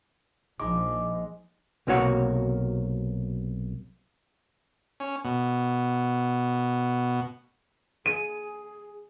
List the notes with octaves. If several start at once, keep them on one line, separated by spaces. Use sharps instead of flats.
A#1 F3 G#3 D#4 D6
B1 C3 A#3 F#4 C#5 F#5
C#4
B2
G#4 D#7